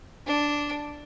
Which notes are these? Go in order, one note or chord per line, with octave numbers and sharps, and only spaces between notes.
D4